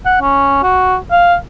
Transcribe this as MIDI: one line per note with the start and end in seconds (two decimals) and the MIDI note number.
0.05 0.20 78
0.21 0.60 61
0.63 0.97 66
1.11 1.35 77